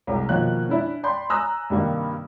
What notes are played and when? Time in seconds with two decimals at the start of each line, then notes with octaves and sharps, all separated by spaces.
0.07 C2 C3 G#3
0.29 B2 D#3 F3 A#3 C#5 F#6
0.69 C#4 D4 E4 E5
1.03 D5 G5 B5 C6 G6
1.30 G#5 A#5 D#6 E6 F#6 A#6
1.70 G2 C3 D#3 G3 A#3